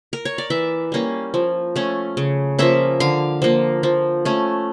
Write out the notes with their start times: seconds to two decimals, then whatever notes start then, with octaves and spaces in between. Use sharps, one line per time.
0.13 A#4
0.25 C#5
0.38 D5
0.50 E3 E5
0.92 G3 A#3 C#4
1.34 F3
1.76 A3 C#4
2.17 C#3
2.59 F3 A#3 C#4 E5
3.00 D3 F5
3.42 F3 A#3
3.83 F3
4.25 A3 C#4